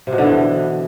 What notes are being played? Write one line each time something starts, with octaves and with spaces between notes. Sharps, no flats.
C3
B2
D3
E3